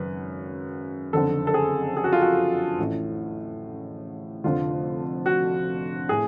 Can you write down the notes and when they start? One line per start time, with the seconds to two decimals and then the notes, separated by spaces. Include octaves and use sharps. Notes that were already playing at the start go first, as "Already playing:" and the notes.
Already playing: G#1 F#2 C#3 B4
1.13 F#1 F2 D3 A4
1.47 A4
1.54 G#4
1.97 G#4
2.04 F#4
2.13 F4
2.21 F#4
2.78 A1 A2
4.44 F1 F2 D3 F4
5.26 F#4
6.09 A2 G#4